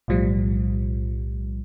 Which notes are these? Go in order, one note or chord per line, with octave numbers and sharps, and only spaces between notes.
B1 A2 F3 G3